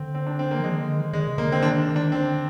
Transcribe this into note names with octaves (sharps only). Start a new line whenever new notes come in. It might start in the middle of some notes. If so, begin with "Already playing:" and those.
Already playing: D3 C4
C4
D4
C4
A#3
F3 G#3
D#3
D3
D#3
D#3 G#3
C3
D3 A#3
C4
D#3 D4
D4
D3 C4